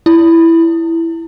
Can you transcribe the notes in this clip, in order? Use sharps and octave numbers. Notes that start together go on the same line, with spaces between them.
E4